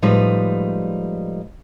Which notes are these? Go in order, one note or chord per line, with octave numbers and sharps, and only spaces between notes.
A2 F3 G3 G#3 D#4 B4